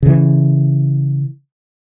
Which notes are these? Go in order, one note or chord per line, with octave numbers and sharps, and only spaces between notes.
C#3 E3